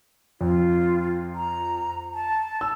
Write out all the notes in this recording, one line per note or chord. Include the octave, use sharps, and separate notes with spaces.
F2 F4
A#5
A5
E6